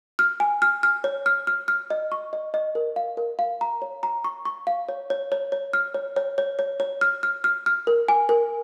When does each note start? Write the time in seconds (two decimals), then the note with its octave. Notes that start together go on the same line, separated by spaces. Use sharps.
0.19 F6
0.40 G#5
0.62 F6
0.83 F6
1.04 C#5
1.26 F6
1.47 F6
1.68 F6
1.90 D#5
2.12 C#6
2.33 D#5
2.54 D#5
2.75 A#4
2.96 F5
3.17 A#4
3.39 F5
3.61 A#5
3.82 C#5
4.03 A#5
4.24 C#6
4.45 C#6
4.67 F5
4.89 C#5
5.10 C#5
5.32 C#5
5.52 C#5
5.73 F6
5.94 C#5
6.16 C#5
6.38 C#5
6.59 C#5
6.80 C#5
7.01 F6
7.23 F6
7.44 F6
7.66 F6
7.87 A#4
8.08 G#5
8.29 A#4